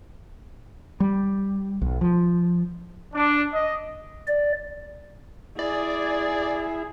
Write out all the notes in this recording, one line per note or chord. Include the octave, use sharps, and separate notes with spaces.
G3
B1
F3
D4
D#5
D5
E4 G#4 D5